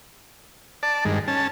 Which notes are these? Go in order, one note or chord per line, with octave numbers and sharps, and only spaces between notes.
D5 A5
G2 D#3 G#3
C#4 A5